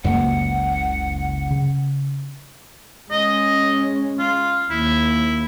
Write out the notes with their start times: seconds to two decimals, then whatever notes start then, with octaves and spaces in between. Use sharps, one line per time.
0.04 F#1 C#2 F#2 A#3 F#5
1.51 C#3
3.11 G#3 C#4 D#5
4.19 F4
4.70 D#2 A#3 E4